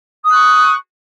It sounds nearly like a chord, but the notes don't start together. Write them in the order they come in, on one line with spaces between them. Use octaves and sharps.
D#6 F#6 C#6